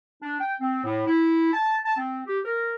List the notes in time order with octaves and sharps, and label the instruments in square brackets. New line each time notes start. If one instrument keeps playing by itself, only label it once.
[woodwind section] D4
G5
C4
A2
E4
A5
A5
C4
G4
A#4